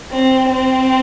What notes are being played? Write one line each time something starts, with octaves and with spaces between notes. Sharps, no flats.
C4
C4